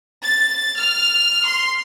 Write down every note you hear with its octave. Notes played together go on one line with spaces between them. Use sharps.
A6
F6
C6